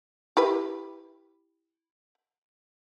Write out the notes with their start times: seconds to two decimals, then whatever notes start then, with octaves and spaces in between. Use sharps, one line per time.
0.37 E4 G4 B4